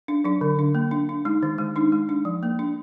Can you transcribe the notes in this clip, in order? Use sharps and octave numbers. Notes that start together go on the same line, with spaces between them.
D4
F#3 D4
D3
D4
A#3
D4
D4
G#3 D#4
D#3
G#3
D4 D#4
G#3
D4
F3
A#3
D4